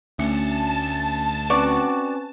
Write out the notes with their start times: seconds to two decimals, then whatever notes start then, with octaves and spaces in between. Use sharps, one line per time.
0.19 D2 A3 C#4 A5 C#7
1.50 C4 C#4 F#4 B4 D5